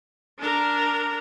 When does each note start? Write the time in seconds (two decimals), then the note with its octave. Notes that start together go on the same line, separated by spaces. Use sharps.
0.39 D4 A#4